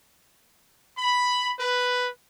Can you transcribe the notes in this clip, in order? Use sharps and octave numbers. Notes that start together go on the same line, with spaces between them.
B5
B4